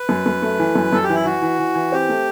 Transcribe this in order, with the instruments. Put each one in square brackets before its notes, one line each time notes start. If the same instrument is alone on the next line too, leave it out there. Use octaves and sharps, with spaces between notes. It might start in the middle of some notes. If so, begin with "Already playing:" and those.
Already playing: [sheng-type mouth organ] B4
[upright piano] F#2
F#2
A3
E3
F#2
[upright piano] F#2 [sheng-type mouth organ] A4
[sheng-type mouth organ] G4
[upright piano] E3
[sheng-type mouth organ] E4
[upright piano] E3 [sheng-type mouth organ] F#4
[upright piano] E3
E3
E3
[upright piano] C4 [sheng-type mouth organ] G4
[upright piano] A3